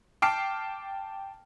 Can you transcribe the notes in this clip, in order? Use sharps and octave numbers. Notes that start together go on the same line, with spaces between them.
G5 A5 D6 F6 C7